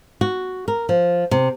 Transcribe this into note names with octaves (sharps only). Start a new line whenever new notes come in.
F#4
A#4
F3
C3